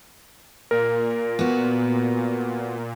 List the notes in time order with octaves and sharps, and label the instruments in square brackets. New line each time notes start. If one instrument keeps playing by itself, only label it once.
[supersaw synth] A#2 [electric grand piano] A#4
[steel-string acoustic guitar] B3 F#4